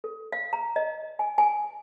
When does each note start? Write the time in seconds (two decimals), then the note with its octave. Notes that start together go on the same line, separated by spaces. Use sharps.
0.04 A4
0.32 F5
0.53 A#5
0.76 D#5
1.19 G#5
1.38 G#5